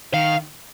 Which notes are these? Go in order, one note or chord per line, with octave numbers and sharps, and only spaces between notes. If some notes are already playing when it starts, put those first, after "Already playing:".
D#3 F5